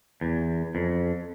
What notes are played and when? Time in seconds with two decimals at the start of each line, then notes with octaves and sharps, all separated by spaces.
0.21 E2
0.75 F2